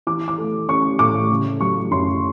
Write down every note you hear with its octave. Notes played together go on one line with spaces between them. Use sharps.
E3 D6
D6
A3
C#4 C#6
A2 D6
C#3
F#3 C#6
F#2 C6